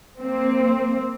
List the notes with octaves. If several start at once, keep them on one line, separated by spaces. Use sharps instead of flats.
A#3 C4